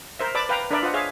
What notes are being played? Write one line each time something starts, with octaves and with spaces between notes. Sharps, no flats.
A#4 C5 E5
B4 D5 A5 B5 D6
B4 F5 G5 A#5
D4 A#4 B4 D5 E5
F4 C5 D#5 F#5
G#4 C#5 E5 F5